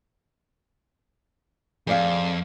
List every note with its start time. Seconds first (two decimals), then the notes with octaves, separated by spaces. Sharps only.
1.87 F2 G#4 D5 F5